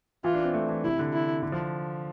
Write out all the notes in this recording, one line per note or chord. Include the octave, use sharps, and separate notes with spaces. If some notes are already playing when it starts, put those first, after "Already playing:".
E3 F4
D4
C4
A3
E3
C3 E4
D3
E4
D3
F3